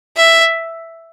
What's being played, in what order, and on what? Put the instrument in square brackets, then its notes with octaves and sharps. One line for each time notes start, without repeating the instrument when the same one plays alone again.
[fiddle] E5